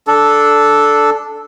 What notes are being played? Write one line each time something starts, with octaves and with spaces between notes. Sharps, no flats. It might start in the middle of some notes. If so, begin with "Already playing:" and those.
D4 A4